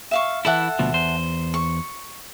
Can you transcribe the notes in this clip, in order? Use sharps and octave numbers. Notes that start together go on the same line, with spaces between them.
E5 F5 C#6
E3 E4 A4 E5 F#5
D2 B2 F3
E2 C5
C#6